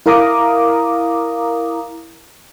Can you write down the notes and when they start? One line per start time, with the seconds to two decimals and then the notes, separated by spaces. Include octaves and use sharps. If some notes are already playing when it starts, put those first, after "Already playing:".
0.06 E4 A#4 F5 A#5 D6 D#6